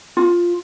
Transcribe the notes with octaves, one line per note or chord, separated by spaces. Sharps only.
F4